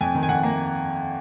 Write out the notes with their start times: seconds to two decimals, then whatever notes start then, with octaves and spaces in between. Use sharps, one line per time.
0.01 F2 G#5
0.15 D#3
0.23 G#5
0.29 F2 F#5
0.43 A#3